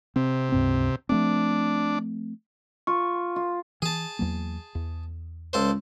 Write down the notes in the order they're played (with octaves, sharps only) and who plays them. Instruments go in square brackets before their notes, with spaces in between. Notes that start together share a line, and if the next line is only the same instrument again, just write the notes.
[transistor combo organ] C3 [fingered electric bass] C4
[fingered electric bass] C#2 G2 C4
[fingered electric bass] F3 A3 C4 [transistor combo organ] D4
[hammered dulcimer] F4 [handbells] C#6
[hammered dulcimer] F4
[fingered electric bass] E3 [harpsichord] G#4 A5
[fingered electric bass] E2 F#3 A#3
E2
[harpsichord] C#2 A4 C5